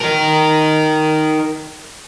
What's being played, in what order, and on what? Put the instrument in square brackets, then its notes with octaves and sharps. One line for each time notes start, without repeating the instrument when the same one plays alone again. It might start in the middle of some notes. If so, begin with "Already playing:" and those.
[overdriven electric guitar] D#4 A#4